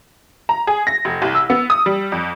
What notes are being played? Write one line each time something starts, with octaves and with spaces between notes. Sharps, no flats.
A#5
G#4
A#6
F1
C2
E6
B3
D#6
G3
F2